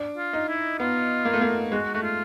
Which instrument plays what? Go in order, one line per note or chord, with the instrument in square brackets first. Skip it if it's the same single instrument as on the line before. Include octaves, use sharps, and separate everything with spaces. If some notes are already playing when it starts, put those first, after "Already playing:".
Already playing: [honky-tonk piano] D4
[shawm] F4
[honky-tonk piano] D#4
[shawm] E4
[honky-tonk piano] B3 [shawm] F4
[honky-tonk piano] A#3
A3
A#3
[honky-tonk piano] G#3 [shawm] F#4
[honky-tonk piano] A3 [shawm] F#4
[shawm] F4